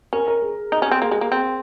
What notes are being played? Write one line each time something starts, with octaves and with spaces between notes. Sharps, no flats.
C#4 A#4
A#4
G#4
D#4
C#4
C4
A#3 G#4
G#3
A#3
C4